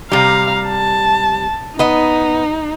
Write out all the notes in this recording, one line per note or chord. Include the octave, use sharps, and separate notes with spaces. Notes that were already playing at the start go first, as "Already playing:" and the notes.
C3 G3 F5 A#5
A5
B3 D#4 D#5